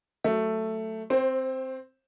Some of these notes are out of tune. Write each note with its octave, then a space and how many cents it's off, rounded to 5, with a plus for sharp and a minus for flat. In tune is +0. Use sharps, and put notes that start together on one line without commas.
F#3 +5 A3 +5
C4 +0 C5 +30